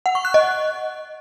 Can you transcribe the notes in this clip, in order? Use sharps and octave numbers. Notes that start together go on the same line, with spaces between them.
F#5
C#6
F#6
D#5